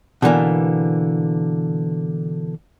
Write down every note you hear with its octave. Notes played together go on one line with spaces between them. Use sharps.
B2 D3 E3 A#3